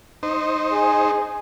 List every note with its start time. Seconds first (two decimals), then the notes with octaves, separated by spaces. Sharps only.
0.23 D#4 C5
0.72 G#4